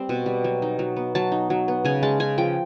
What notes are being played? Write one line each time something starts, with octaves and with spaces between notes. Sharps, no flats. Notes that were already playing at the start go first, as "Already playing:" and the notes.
Already playing: G3 C4 C6
B2
G3
F#3
D#4
F#3
B3
F#3 A5
D#4
F#3
B3
C#3 G#5
G#3 A5
C#3 G#5
F3 G5